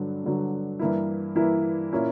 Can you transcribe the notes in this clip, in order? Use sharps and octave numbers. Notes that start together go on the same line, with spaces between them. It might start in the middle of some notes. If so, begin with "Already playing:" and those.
Already playing: G2 D3 F#3
G2 D3 F#3
G2 E3 A#3 E4
G2 E3 A#3 E4
A#2 A#3 C#4 E4